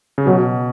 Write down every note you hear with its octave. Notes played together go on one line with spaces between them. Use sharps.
C#3
B2 F#3